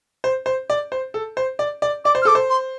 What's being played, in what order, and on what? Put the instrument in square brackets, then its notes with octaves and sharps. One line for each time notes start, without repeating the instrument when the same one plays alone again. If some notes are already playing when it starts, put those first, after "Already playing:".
[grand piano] C5
C5
D5
C5
A4
C5
D5
D5
[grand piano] D5 [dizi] D6
[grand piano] C5
[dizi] F6
[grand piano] A4 [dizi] D6
[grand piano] C5
[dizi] C6